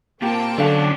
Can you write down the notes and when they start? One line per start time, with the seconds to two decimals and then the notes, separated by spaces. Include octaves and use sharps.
0.22 A#2 C4 F4 G4 G5 A5
0.58 D3 F#3 C#4 D4 A4 D5 F5